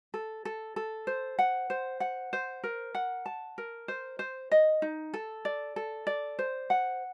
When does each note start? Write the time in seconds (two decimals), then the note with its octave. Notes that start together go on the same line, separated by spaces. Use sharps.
0.14 A4
0.45 A4
0.76 A4
1.07 C5
1.39 F#5
1.70 C5
2.00 F#5
2.33 C5
2.64 A#4
2.95 F#5
3.26 A5
3.58 A#4
3.88 C5
4.19 C5
4.52 D#5
4.82 D#4
5.14 A4
5.45 D5
5.76 A4
6.07 D5
6.39 C5
6.70 F#5